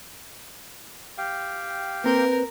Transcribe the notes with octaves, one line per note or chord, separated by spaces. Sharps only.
G4 F5 G5
A#3 C4 A#4 B4 G6